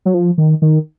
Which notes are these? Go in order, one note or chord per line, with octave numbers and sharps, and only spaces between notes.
F#3
F3
D#3
D#3